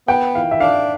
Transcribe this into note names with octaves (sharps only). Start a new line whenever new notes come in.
B3 G5
E3 F5
E5
D4 F5